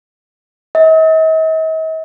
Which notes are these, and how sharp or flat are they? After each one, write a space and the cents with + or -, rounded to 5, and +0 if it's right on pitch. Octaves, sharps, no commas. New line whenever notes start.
D#5 +45